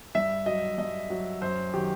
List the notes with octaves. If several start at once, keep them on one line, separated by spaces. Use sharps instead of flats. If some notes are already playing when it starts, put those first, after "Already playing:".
G2 E5
F#3 D#5
G2 D#5
F#3
F#2 C5
D#3 F#3 G4